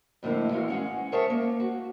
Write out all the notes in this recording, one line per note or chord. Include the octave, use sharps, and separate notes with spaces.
F2 A2 D3 A#3 E4
A2 E3 G#3 F#4 F5
G#3 C#4 F#5
G#4 A#4 C5 C#5 E5 A5
A#3
F#4